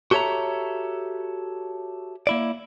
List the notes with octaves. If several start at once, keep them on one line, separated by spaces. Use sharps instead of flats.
F#4 G4 A4 C#5 E5 A#5
A#3 E4 D5